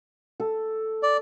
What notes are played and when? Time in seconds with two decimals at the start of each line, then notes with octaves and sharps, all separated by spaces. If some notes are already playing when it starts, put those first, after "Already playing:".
0.40 A4
1.03 D5